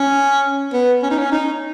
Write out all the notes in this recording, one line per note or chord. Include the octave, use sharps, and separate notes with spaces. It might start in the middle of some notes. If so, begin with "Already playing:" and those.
Already playing: C#4
B3
C#4
D#4
C#4
D#4